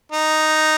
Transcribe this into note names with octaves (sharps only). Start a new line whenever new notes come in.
D#4